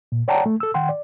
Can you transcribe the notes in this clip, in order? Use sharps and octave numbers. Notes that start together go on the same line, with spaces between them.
A#2
C#5 D5 F#5 G5 A5 A#5
A3
A4 E6
D#3 F#5 G5 C6
D5